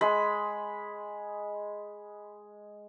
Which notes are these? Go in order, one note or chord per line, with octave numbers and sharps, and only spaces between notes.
G#3 B5 C6